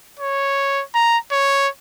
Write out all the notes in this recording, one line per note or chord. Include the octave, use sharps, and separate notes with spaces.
C#5
A#5
C#5